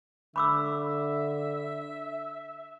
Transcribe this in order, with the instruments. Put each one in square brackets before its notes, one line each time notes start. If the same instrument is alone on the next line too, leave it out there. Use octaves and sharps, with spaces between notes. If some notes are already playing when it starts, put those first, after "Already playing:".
[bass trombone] D3 [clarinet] E5 [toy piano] B5 D6 E6